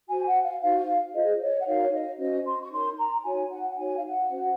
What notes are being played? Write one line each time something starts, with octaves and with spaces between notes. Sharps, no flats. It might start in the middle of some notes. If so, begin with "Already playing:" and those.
F#4 C5 G#5
F#5
F5
D#4 F#4 C5 F5
F4 G#4 C5 D#5
C#5
F#5
D#4 F#4 A#4 C#5 F5
C#5
D#5
C#4 F#4 C5 D#5
C6
C#6
D#4 A#4 C#5 C6
A#5
D#4 F#4 C#5 G#5
F#5
F#5
D#4 F#4 C#5 G#5
F5
F#5
C#4 F#4 C5